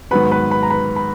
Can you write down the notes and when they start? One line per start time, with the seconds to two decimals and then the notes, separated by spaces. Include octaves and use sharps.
0.11 G#2 D#3 F#3 B3 B4 B5
0.32 B4 B5
0.51 B4 B5
0.63 A#5
0.71 B4 B5
0.96 B5